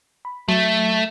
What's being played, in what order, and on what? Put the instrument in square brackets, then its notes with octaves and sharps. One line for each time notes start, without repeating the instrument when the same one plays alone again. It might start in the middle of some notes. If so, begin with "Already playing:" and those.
[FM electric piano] B5
[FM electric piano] F#3 [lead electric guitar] A3